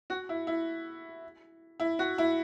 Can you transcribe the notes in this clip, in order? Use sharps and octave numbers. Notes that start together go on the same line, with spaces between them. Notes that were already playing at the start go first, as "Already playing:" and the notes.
F#4
E4
E4
E4
F#4
E4